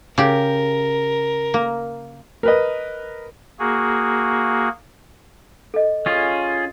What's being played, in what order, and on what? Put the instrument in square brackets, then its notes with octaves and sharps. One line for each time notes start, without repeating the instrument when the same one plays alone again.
[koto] C#3 G4 [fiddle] A#4
[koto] A#3
[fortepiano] A#4 B4 D#5
[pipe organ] A#3 F#4 G#4
[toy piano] A4 D#5
[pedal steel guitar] C#4 F4 G#4 [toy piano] D#6